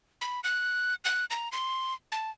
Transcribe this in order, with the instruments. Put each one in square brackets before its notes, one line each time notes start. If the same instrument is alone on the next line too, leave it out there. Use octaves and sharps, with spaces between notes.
[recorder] B5
F#6
F#6
A#5
C6
A5